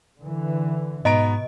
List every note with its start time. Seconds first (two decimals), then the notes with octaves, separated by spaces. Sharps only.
0.22 D3 E3
1.05 G#2 B2 B3 D#5 A#5 D7